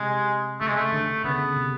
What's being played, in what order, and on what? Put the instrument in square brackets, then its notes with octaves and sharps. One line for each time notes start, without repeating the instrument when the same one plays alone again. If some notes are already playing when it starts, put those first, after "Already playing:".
Already playing: [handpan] C3 [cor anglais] G#3
[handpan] C#3 [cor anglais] A3
[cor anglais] G#3
A3
[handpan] D3
[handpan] C#3 [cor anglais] B3
[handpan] C3